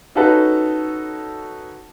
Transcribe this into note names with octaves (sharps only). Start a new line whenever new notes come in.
C#4 D#4 F#4 G#4 A4 B4